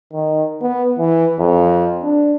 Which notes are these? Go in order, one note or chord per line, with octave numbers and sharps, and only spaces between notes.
D#3
B3
E3
F2
D4